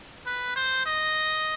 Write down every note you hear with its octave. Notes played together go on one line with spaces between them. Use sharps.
B4
C5
D#5